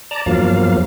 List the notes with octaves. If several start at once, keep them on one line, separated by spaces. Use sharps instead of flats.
D5 A5 A#5
E2 G2 F3 F#3 A#3 F5